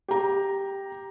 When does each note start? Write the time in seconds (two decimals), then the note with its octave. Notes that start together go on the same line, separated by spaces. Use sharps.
0.08 G4 A#5